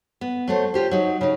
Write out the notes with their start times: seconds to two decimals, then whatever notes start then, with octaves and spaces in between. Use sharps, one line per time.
0.21 B3
0.48 F#3 A3 C5
0.74 F4 G4 C5
0.91 F#3 D#4
1.21 C#3 D#4